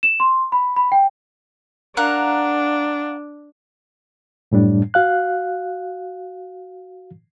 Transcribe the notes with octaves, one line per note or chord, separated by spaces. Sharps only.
E7
C6
B5
B5
G5
D4 A#4 F5 F#5
F#2 A2 G3 D4
F#4 F5 F#6